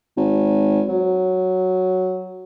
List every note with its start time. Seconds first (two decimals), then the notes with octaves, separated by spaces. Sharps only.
0.17 G#1
0.89 F#3